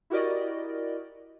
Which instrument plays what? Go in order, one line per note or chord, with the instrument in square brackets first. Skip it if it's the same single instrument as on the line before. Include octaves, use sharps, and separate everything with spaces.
[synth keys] E4 F#4 G4 A#4 D5 D#5